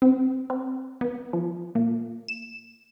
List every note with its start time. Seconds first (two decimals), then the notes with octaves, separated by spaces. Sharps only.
0.02 C4
0.50 C4
1.01 B3
1.33 F3
1.75 A#2
2.28 E7